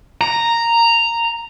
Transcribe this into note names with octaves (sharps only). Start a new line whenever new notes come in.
A#5